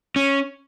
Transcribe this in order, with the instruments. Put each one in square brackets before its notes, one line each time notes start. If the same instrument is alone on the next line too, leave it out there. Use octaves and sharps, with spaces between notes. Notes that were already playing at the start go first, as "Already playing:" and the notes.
[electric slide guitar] C#4